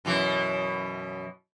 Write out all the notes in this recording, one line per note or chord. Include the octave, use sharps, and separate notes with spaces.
F#2 B2 E3